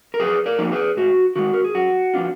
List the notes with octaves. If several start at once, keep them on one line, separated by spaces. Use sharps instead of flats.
A#4
F#2 G#4 B4
A#4 D5
F3 A#3 D#4
G#4 B4
G#2 F#4
D#3 G#3 F#4
A#4
G#4
F#2 F#4
F3 B3 D4 F4